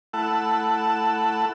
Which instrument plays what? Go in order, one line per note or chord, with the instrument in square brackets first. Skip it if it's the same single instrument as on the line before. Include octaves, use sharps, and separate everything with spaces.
[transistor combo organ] A3 E4 A4 F#5